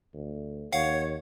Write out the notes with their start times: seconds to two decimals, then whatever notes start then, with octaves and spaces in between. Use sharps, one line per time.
0.13 D2
0.73 D#2 C#5 F5 F#5